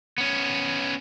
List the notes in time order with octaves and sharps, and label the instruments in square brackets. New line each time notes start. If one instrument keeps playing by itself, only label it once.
[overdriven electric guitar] B3 C#4